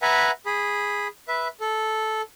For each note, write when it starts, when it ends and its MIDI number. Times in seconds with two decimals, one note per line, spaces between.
0.02 0.31 71
0.02 0.31 76
0.02 0.31 78
0.02 0.31 80
0.02 0.31 82
0.46 1.08 68
0.46 1.08 83
1.28 1.48 71
1.28 1.48 76
1.60 2.22 69